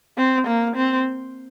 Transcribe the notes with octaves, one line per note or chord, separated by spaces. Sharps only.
C4
A#3
C4